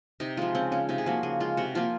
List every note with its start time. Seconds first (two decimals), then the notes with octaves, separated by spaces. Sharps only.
0.20 C3 D#4
0.37 F3 G#3 F4
0.55 C#3 C4
0.72 G#3 C#4
0.89 C3 D#4
0.98 G#4
1.06 F3 A#3 F#4
1.23 C#3 G#4
1.40 G#3 F4
1.57 C3 F#4
1.75 F3 A#3 F4